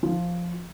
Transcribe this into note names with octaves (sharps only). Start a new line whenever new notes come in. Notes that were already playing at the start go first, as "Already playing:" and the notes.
F3